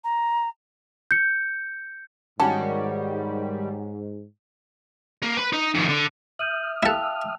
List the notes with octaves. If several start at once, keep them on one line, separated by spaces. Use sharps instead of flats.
A#5
G6 C#7
G#2 D#3 G3 C#4 F#4 A5
A#3
B4 B5
D#4
F2 D#3
D3
E5 D#6 F6 G6 D#7 F#7
E4 A4 F5 G5 A5 E6 F#6 F7